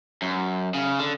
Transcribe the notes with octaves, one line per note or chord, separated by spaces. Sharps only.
F#2
C#3
D3